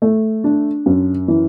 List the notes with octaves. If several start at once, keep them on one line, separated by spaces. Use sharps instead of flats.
A3
D4
F#2
E3